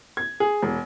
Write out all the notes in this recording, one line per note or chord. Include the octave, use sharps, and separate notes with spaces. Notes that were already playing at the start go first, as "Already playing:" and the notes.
G#6
G#4
E1